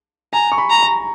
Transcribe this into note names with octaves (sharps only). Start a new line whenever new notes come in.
G#5 A#5
C#6
B5
A#5
A#5